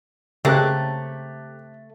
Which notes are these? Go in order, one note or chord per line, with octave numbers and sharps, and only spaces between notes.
C#3 A3 A#3 C4 G4 F#6